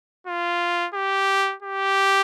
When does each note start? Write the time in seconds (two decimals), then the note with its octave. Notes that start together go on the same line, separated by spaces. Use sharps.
0.27 F4
0.94 G4
1.63 G4